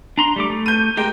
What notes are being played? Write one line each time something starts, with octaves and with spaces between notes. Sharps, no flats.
D4 A#5 C6
G3 A3 D6
A3
G6 D#7
G#3 G4 A#4 G5